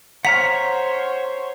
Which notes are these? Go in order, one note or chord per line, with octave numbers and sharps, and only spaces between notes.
C5 C#5 F#5 A#5 F6 B6